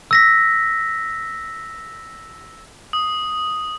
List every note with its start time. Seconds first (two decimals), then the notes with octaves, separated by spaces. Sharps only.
0.11 E6 A#6 B6
2.93 D#6